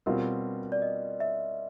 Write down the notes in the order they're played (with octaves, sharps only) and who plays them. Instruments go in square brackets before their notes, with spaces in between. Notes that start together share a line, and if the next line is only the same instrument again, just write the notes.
[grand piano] B2 G3 C4 F4 [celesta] A#4
[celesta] D5
D#5
E5